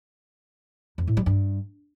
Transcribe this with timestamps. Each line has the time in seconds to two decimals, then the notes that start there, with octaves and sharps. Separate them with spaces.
0.98 F2
1.07 A2
1.17 G3
1.26 G2